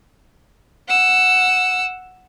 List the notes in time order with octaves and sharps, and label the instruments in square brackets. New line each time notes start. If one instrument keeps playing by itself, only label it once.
[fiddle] F#5 E6